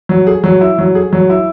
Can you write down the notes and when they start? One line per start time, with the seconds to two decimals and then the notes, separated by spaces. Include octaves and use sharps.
0.09 F#3
0.27 G#4
0.44 F#3
0.61 E4
0.79 F#3
0.95 G#4
1.13 F#3
1.30 E4